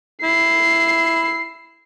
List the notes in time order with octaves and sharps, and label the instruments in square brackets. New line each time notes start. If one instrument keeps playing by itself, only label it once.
[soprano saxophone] E4 [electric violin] C7